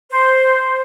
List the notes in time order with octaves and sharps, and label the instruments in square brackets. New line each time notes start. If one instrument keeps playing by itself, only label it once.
[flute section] C5